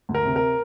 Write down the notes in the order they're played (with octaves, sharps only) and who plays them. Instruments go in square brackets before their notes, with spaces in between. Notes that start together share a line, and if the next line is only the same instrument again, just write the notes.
[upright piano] D2
A#4
C3
A#4